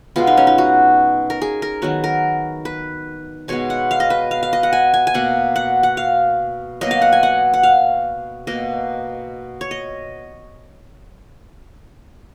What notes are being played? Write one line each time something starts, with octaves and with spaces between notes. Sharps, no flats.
B2 G#3 B3 F4
D#4
C#4
D#4
F#4
A#4
G#4
A#4
D#3 F#3 B3 F#4
A#4
B4
B2 G#3 B3 C#5
F#5
F5
D#5
B4
F5
F5
D#5
F#5
G#5
G#5
G#5
B2 A#3 F#5
F#5
F#5
F5
B2 F#3 A#3 D#5
F5
F#5
G#5
F#5
F#5
F5
B2 A#3 D#5
C#5
D#5